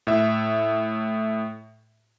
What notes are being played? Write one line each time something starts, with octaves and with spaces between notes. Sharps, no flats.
A2 E5